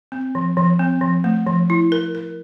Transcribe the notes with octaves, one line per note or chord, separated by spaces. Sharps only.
C4
F3
F3
C4
F3
A3
F3
E4
A#4
A#4